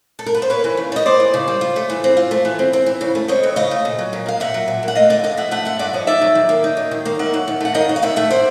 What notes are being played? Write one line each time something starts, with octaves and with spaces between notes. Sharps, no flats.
A4
A#4
B4
C5
A#3 B4 C#5
E3
C#3
G3 D#5
A#3 C5 D5
E3
C#3
G3
F4
A3
E3
C4
F4
A3
E3
C4
C4
E3
C#3
A3
C4 C#5 D#5
E3
C#3 D#5 F5
A3
A#2
F#3
A#2
A#3 F5
A#2 E5 F#5
F#3
A#2
A#3
F#5
A3 D#5 F5
D3 D5 E5
G2 D#5 F5
F3 E5 F#5
A3 E5 F#5
D3 E5 F#5
G2 D5 E5
F3 C#5 D#5
D#4 D5 E5
F#3
D#3
A#3
D#4
F#3
D#3
A#3
D#3 E5 F#5
F#3
D#3
A3 F#5
D#3 D#5 F5
F#3
F5
D#3 E5 F#5
A3 E5 F#5
C5 D5